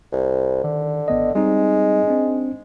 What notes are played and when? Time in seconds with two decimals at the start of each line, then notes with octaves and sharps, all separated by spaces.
0.12 C2
0.64 D3 D#3
1.08 G#1 B3 D#5
1.35 G3 G#3 C4 D#4
2.08 C4 D4